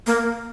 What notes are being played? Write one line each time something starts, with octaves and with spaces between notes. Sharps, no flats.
A#3